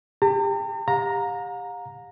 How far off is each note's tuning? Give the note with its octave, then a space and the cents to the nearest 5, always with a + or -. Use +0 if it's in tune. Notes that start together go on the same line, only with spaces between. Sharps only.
G4 +30 A#5 -45
F5 +45 A#5 +0